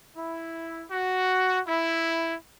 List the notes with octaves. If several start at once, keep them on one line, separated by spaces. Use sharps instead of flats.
E4
F#4
E4